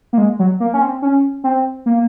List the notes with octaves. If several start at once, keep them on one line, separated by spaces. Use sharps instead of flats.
A#3
G#3
F#3
A#3
C#4
C4
C#4
C4
A#3